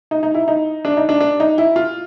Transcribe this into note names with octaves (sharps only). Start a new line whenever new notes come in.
D#4
D#4
E4
D#4
D4
D#4
D4
D4
D#4
E4
F4